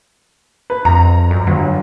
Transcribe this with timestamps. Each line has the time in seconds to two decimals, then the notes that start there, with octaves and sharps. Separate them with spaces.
0.70 B4
0.85 F2 A#5
1.31 F#2
1.47 G1 F#3